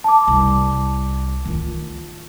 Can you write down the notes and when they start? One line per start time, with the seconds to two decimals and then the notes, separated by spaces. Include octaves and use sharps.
0.04 A5 D6
0.27 C2
1.45 D#3 F4